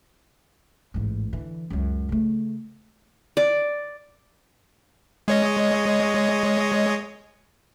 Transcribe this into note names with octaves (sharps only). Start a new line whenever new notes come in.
A1 G#2
D3 E3
C#2 F#2
C#3 A3
D5
G#3 C#5 D#5